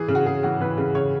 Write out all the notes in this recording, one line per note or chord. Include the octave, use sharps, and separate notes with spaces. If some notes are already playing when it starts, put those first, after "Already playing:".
Already playing: E3 G#4
C#3
F#4
C#3 G#4
E3 F#4
E3 B4
C#3
C#3 C#5